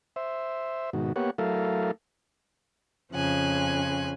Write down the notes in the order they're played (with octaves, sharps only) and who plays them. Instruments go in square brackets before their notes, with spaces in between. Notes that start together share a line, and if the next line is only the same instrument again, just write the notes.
[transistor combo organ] C5 E5
G#2 B2 D#3 F#4
A#3 B3 G4 C#5 F#5
F#3 A3 E4 A4 A#4 F5
[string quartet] F2 C#3 F3 G#5 F#6